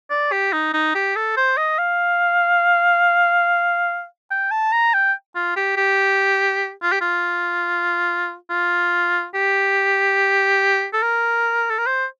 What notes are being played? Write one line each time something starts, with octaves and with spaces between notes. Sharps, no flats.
D5
G4
D#4
D#4
G4
A4
C5
D#5
F5
G5
A5
A#5
G5
F4
G4
G4
F4
G4
F4
F4
G4
A4
A#4
A4
A#4
C5